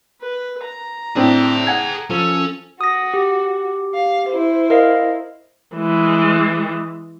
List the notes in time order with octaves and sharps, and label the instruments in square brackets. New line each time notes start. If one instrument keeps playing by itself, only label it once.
[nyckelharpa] B4
A#5
[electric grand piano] A2 C4 D4 [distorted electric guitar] G#4 G5
[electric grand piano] F#5 G#5 G#6
[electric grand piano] F3 [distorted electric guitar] C#4 [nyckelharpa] A4
[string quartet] F#4 [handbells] D#6 A#6
[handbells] G4
[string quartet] F5
E4 C5
[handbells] A#4 D#5 F5
[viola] E3 G#3